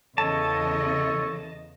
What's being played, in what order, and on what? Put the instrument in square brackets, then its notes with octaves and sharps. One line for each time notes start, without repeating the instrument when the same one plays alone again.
[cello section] E2 C#3 D#5 [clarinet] A4 [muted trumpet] C#5 [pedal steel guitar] A5